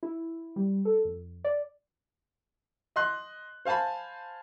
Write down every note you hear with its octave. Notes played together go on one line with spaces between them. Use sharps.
E4
G3
A4
F2
D5
D#5 C6 F#6
C5 F5 G#5 A5 B5